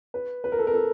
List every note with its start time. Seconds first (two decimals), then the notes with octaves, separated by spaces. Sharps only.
0.14 B4
0.44 B4
0.52 A#4
0.59 A4
0.67 A#4
0.74 A4